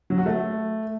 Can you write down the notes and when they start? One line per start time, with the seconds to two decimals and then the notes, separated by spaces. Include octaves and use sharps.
0.10 F#3
0.18 F#4
0.26 A3